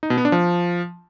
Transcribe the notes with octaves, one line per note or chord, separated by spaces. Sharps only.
D#4
B2
B3
D4
F3